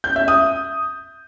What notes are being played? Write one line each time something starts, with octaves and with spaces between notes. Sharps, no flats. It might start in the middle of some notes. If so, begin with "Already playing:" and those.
G6
E5
D#6